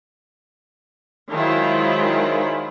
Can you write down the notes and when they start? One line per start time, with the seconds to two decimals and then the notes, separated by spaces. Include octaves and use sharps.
1.30 D#3 F#3 G#3 E4 F4 C5